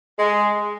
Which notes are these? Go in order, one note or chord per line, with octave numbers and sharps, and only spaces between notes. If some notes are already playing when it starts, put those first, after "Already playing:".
G#3